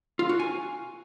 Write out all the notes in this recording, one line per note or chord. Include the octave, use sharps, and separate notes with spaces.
F4
F#4
G#5